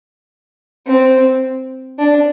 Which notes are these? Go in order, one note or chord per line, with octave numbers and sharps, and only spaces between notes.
C4
D4